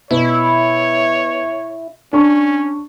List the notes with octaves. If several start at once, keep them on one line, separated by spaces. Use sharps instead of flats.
B2 E4 C#5
C#4 D4 C#6